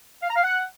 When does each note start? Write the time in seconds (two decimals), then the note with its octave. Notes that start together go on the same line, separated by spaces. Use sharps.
0.23 F5
0.29 A#5
0.36 F5
0.43 F#5